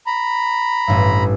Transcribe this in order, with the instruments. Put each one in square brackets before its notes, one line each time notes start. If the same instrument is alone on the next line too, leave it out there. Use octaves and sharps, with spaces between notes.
[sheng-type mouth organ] A#5 B5
[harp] A1 G2